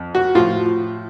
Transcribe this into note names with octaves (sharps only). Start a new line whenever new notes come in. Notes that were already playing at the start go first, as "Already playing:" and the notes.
Already playing: F2
F#4
A2 F3 F4